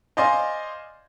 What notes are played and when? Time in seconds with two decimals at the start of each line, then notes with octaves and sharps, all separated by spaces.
0.17 C5 D5 D#5 F5 G#5 C6